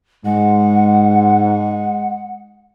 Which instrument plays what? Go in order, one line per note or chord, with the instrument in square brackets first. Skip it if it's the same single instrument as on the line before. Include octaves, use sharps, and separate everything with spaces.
[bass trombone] G#2 [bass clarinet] G#3 [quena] F#5